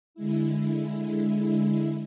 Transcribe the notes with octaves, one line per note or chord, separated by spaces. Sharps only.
D3 G#3 E4